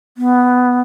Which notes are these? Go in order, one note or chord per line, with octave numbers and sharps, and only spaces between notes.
B3